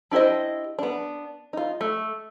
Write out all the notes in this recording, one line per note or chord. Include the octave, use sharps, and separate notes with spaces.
D4 E4 G4 C5 D#5
B3 D4
D#4 F4
A3